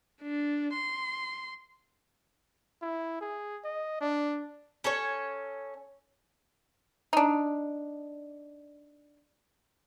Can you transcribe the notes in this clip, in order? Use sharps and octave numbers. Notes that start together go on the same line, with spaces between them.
D4
C6
E4
G#4
D#5
D4
C#4 A4 C#5
D4 D#4